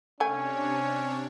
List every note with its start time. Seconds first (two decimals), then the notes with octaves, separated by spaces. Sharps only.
0.20 C3 A3 C#4 D4 C#5 G#5